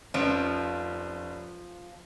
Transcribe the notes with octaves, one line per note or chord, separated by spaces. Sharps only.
F1 F3 C#4 D7